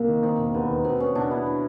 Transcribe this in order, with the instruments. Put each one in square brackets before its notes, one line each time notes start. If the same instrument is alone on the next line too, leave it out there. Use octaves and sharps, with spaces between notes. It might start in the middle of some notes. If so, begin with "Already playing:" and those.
Already playing: [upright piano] C2 [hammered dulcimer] A#3
[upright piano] D#3
[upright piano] D#3 [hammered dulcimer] C4
[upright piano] E1
[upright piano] D#2 [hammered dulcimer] B3
[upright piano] D#3
[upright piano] B2 [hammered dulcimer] C4
[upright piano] B3 [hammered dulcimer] C#4
[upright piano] B2 [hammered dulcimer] D4
[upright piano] B3 [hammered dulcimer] E4
[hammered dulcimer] E4